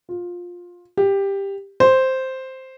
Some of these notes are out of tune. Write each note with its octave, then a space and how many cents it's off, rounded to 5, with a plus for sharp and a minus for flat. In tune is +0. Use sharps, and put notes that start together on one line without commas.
F4 +15
G4 +10
C5 +0